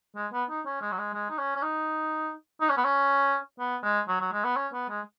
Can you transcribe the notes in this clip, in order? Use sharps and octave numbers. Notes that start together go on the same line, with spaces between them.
G#3
B3
D#4
C#4
G#3
F#3
G#3
G#3
D#4
C#4
C#4
D#4
D#4
C#4
B3
C#4
B3
G#3
F#3
F#3
G#3
B3
C#4
B3
G#3